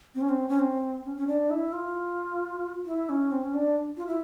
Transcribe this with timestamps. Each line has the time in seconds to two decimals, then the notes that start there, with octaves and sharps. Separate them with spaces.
0.15 C4
0.21 C#4
0.29 C4
0.49 C#4
0.59 C4
1.05 C#4
1.16 C#4
1.27 D4
1.50 E4
1.72 F4
2.86 E4
3.09 C#4
3.32 C4
3.44 C#4
3.54 D4
3.97 F4
4.07 E4